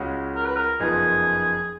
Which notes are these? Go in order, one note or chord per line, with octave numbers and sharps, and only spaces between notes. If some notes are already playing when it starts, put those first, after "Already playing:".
Already playing: C#2 C#3 G#3 C#4 F#4
A#4
B4
A#4
F#1 F2 F3 B3 D#4 G#4